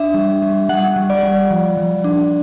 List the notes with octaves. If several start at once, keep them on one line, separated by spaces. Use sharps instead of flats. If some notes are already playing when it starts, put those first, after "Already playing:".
Already playing: D4 E5
G3
G3
G3 F#5
G3
D5
G3
F3
F3
D4